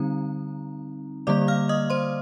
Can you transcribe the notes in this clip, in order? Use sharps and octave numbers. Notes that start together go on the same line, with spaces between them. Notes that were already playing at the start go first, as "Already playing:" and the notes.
Already playing: D3 G3 C4 D#4 A#5
D3 G3 A#3 D5 D6
F5 F6
D#5 D#6
C5 C6